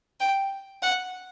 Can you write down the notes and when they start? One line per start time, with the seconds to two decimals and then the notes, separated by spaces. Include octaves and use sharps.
0.20 G5
0.83 F#5